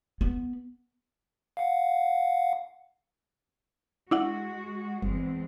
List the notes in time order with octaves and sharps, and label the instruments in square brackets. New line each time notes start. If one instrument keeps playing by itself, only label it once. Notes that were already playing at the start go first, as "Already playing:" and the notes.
[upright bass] B3
[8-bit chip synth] F5 F#5
[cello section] G#3 F#4 [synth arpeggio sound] D4 E4 F#5
[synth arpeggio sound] G1 [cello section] E2 G#3 C4